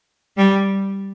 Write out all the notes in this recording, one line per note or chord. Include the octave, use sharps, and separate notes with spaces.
G3